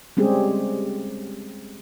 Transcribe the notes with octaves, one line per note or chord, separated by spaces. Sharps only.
G3 G#3 C4 C#4 G4 G#4